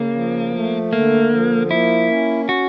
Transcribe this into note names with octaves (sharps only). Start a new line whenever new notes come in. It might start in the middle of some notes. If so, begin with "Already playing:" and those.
Already playing: C#3 A#3
F3
A3
D3 A#3
F3
A#3 E4
C#4
F#4